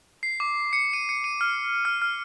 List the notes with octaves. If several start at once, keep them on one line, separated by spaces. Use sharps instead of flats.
C7
D6
C#7
D#7
C#7
D#7
F6
F6
F6